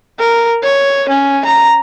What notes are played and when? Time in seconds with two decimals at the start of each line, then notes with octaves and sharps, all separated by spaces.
0.20 A#4
0.63 C#5
1.09 C#4
1.45 A#5